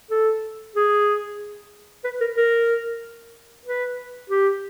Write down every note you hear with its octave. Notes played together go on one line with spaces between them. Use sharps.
A4
G#4
B4
A#4
A#4
B4
G4